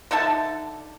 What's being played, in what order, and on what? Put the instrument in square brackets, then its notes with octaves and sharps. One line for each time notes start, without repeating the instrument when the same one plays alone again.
[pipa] D3 D#4 E5 A5